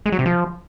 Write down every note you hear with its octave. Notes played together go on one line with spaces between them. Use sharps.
G#3
F#3
C3
F3